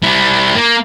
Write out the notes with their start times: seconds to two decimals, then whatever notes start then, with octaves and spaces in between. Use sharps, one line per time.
0.04 G3 E4
0.55 A#3